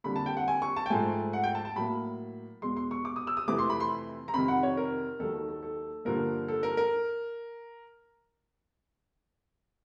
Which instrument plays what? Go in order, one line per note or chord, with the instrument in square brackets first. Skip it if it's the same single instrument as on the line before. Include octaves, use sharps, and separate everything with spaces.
[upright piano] F2 D3 G3 A#3 B5
A5
G5
F#5
G#5
C#6
A5
G5
G#2 F3 A3 G#5
F#5
G5
A5
A5
A2 F#3 A#3 B5
E2 B2 G#3 C6
C6
C#6
D6
D#6
E6
D#6
F2 C3 E3 A3 D6
C6
B5
C6
A#5
F2 C3 D#3 B5
F#5
C#5
A#4
D#2 D#3 F#3 A4
A4
A4
A4
G2 D3 F3 A#3 A#4
A4
A#4
A#4